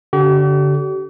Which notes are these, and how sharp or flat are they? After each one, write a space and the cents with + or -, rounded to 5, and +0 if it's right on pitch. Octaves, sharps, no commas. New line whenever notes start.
D3 -35 G4 -45